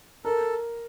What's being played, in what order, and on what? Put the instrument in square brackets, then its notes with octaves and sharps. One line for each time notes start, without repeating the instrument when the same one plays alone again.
[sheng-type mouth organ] A4 [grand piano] A#4